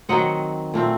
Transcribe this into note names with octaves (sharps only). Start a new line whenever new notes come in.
D#3 F#3 C4 D#5 F#5
A#2 A3 C4